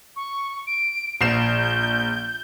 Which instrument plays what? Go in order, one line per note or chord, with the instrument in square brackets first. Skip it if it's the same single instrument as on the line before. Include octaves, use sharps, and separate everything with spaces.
[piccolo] C#6
D7
[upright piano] A#1 C7 E7 [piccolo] G6